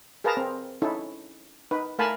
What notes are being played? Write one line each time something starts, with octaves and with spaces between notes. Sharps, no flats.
G#4 A#4 B4 F5 A5 A#5
C4
C#4 D#4 E4 A4
D#4 B4
A3 A#4 F5 G#5 A5 B5